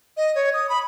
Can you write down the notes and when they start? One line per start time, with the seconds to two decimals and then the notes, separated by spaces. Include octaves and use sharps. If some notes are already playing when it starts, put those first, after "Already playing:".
0.17 D#5
0.35 C#5
0.54 D#6
0.69 B5